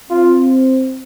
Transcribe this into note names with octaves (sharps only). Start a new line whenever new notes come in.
C4 F4